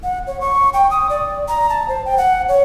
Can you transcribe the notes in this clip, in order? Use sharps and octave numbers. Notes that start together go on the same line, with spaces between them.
F#5
C#5
C#6
G5
D#6
D5
A#5
A5
C5
G5
F#5
C#5